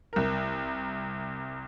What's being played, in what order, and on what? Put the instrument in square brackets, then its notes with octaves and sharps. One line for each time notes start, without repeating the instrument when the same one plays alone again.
[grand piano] C2 A#4